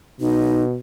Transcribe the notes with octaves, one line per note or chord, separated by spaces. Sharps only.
B2 D#4